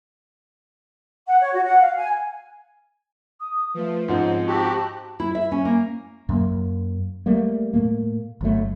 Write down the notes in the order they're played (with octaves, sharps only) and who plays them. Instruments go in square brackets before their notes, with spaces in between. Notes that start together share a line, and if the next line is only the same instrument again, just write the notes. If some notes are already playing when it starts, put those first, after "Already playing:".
[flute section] F#5
C#5
F#4
F#5
F5
G#5
[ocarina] D#6
[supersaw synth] F3 A3 F4 [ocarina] B4
[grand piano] G#2 F3 [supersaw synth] C4 C#4 D#4 [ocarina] F#5
[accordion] C4 F#4 G4 [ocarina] A5 [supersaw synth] A#5 F#6
[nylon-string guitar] E4
E5
C#4
A#3
[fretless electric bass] F#2 F#3 A#3
G3 A3 A#3
A2 A3 A#3
G1 F#3 A3